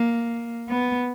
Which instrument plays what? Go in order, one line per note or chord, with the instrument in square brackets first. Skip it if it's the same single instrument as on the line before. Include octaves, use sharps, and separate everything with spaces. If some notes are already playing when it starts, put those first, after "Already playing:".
Already playing: [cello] A#3
B3